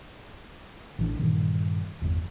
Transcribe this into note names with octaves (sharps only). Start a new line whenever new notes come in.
A1 E3 D4
G2 A#2 D#3
G1 E2